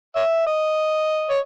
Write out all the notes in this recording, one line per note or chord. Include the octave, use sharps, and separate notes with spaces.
C#5 E5
D#5
C#5